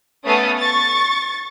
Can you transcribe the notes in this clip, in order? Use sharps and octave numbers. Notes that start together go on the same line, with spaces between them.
A3 B3 C#4 A4 F5 D#6
C#6 A6